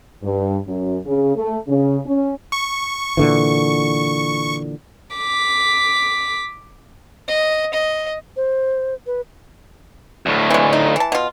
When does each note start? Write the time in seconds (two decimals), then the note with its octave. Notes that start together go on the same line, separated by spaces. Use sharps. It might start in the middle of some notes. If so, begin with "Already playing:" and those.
0.23 G2
0.67 F#2
1.06 C#3
1.35 A3
1.68 C#3
2.06 C#4
2.52 C#6
3.17 A#2 D3 E3
5.16 D6 B6
7.28 D#5
7.74 D#5
8.36 C5
9.06 B4
10.26 D2 A2
10.50 E3 G#3
10.73 D#4
10.96 E3 A5
11.12 B2 F4